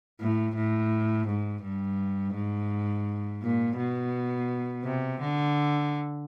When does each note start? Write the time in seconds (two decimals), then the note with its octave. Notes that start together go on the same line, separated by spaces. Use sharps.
0.21 A2
0.55 A2
1.27 G#2
1.62 G2
2.35 G#2
3.42 A#2
3.77 B2
4.84 C3
5.21 D3